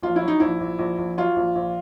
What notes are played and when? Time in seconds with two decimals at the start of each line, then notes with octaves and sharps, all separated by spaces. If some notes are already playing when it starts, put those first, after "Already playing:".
0.03 A#1 F4
0.16 E4
0.22 F#3
0.28 D#4
0.40 A#1 E4
0.60 A#1
0.79 A#1
0.98 A#1
1.18 F#3 F4
1.36 A#1
1.55 A#1